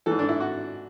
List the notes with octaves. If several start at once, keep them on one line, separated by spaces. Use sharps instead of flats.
G#2 E3 A4
D4
E4
F#4